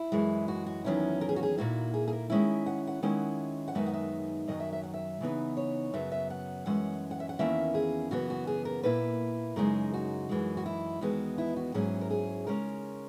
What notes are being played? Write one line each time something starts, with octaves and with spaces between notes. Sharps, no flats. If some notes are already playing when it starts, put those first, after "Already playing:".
Already playing: E4
F#2 E3 G#3
F#4
F#4
E2 D#3 F#3 C#4 E4
A#4
G#4
F#4
G#4
A#2 A#3 E4 F#4
G#4
G#4
A#4
D#3 G#3 C#4 E4 E5
F#5
F#5
D#3 G#3 C#4 E4 F#5
F#5
F#2 D#3 G#3 B3 D#4 E5
F#5
E5
F#2 D#3 F#3 D#5
E5
E5
F#5
E5
C#3 E3 B3 D#4
C#5
F#2 C#3 F#3 B3 E5
E5
F#5
F#2 E3 G#3 C#4 F#5
F#5
E5
F#5
E2 D#3 A#3 C#4 E4 E5
G#4
F#2 C#3 E3 B3 F#4
F#4
G#4
A#4
A#2 A#3 E4 B4
F#2 C#3 G#3 D#4 A#4
F#4
F#2 E3 G#3
F#4
E4
E2 D#3 G#3 B3 F#4
E4
F#4
G#2 F#3 C#4 E4 G#4
A#4
G#4
C#3 G#3 C#4 A#4